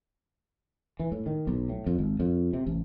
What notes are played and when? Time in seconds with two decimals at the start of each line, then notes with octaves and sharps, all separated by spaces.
0.99 E3
1.12 A2
1.26 D#3
1.47 B1
1.69 A2
1.86 F2
1.98 G#1
2.20 F2
2.53 C3
2.67 A1